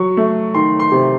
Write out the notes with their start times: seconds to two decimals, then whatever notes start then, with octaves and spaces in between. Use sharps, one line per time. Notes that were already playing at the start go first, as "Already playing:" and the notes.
Already playing: F#3 C#6
0.17 A3
0.55 D#3 C6
0.80 C6
0.92 C3